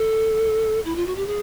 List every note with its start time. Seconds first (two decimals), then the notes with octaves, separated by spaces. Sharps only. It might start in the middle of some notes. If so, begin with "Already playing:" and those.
Already playing: A4
0.85 E4
0.95 F4
1.06 F#4
1.16 G4
1.26 G#4